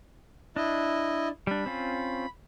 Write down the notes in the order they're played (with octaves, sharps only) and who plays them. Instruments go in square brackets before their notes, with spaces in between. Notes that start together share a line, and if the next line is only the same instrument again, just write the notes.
[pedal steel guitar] D4 [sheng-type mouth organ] E4 D#5
[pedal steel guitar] G3 D4 [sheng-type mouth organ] B5
[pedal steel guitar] C4 C#4 F4